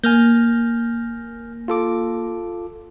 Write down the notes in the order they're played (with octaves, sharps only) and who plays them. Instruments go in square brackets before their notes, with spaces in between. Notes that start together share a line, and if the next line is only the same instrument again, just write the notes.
[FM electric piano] A#3 [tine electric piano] G#5 F6 G6
[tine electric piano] F4 A4 D6